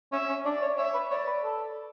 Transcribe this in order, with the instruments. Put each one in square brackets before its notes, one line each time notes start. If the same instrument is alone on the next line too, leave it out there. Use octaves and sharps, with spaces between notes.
[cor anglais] C#4 [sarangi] E5
[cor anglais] C#4
[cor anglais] D4 [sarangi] D5
[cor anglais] C#5
[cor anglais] C#5 [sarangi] E5
[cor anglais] B4
[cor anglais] C#5 [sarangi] D5
[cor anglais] B4
A4